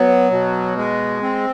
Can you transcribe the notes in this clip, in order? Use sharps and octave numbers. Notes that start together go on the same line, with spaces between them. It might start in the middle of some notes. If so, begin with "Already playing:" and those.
Already playing: F#3 B3
B2
G#3
C4